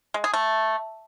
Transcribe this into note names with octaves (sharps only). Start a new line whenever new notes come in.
G#3
G#4
A3